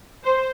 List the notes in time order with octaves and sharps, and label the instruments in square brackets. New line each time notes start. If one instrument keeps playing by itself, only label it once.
[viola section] C5